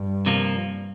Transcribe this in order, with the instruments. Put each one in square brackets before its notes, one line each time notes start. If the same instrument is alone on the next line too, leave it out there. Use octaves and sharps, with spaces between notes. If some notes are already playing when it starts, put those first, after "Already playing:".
Already playing: [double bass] G2
[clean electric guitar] C3 F3 A#3